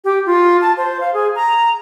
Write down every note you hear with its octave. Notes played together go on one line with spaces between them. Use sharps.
G4
F4
A5
C5
F5
G#4
A#5